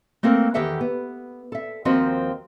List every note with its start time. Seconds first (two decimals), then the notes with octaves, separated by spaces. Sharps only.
0.23 A3 A#3 C4 A4 A#4
0.54 E2 D#3 G4 A4 E5 F#5
0.81 B3
1.52 A4 E5
1.85 D#2 F3 C4 F#4 A#4 D#5